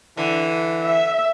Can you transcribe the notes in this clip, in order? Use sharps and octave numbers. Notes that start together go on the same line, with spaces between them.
D3 E3
E5